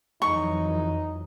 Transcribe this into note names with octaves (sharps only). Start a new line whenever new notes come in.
F2 E3 F#3 D#4 C#6